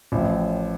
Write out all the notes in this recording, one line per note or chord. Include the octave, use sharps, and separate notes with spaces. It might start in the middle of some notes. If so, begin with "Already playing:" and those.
A1 A2 F3